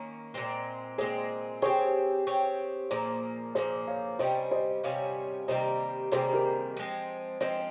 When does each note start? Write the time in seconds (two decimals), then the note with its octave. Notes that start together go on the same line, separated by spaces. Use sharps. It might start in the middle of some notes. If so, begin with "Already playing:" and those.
Already playing: D#3 A#3 C#4
0.34 A#2 G#3 C4
0.98 A#2 G#3 C4 G#4 C5
1.62 C4 G4 G#4 C5 C#5
2.27 C4 G4 C#5
2.91 A#2 F3 A#3 G#4 C5
3.55 A#2 F3 A#3 G#4 C5
3.87 C#5 F5
4.19 C3 G3 C#4 G#4 C5 D#5
4.51 C5 D#5
4.84 C3 G3 C#4 G#4 C#5 F5
5.48 C3 D#3 G3 A#3 C5 D#5
6.12 C3 D#3 G3 A#3 G#4 C5
6.33 G4 A#4
6.77 F3 G#3 C4
7.40 F3 G#3 C4 C5 D#5